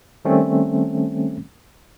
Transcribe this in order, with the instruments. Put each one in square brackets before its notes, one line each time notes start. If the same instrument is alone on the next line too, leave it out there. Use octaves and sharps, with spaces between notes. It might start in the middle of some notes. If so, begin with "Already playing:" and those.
[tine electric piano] D#3 G3 A3 C4 C#4